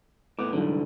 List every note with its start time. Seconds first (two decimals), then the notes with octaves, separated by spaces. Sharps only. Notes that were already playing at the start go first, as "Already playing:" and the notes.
0.39 A2 B3 D6
0.53 C2 G#2 D3 E3 F#3